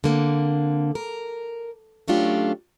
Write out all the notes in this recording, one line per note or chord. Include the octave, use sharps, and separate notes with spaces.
D3 A#3 C4
A#4
F#3 A3 C#4 D4 F4 G4